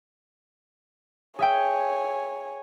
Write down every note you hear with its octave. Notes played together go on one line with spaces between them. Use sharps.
G#4 C#5 E5 G5 G#5